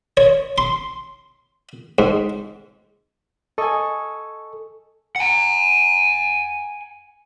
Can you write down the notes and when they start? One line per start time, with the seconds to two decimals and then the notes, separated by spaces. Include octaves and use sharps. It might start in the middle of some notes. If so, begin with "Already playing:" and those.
0.17 C#5
0.58 C6
1.99 G#2
3.58 A4 D#5 G#5 C#6
5.16 F#5 G#5